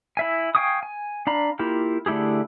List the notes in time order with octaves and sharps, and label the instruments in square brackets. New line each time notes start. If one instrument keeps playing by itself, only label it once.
[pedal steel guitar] E4 E5 G#5
F5 G5 G#5 C#6 D#6
G#5
D4 F5 A#5 B5
A#3 E4 F4 G4
D3 A3 E4 G4 G#4